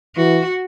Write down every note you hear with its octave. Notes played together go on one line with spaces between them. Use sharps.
E3 F#4